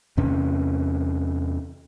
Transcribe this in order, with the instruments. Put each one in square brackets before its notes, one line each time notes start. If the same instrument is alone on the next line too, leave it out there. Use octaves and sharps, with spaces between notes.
[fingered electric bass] E2 C3 C#4